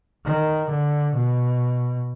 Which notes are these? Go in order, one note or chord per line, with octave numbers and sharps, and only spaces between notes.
D#3
D3
B2